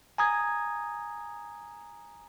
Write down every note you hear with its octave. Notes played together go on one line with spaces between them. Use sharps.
G#5 A#5 D#6 G#6